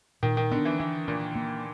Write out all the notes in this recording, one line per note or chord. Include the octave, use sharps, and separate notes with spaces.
A#2 D#3
D#3
D3 B3
E3
E3 D4
A#2 D4
A#3